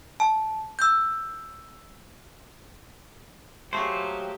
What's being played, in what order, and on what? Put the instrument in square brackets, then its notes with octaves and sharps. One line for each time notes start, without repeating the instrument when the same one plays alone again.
[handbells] A5
E6 G6
[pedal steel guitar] F#3 A#3 C5 [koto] A3 G#4 [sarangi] G4